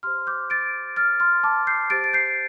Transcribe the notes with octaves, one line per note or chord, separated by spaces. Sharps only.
G4 C5 C6 F6
D6 G6
A6 D7
F6 A6
C6 F6
A5 D6
G6 C7
G4 C5 A6 D7
A6
G6 C7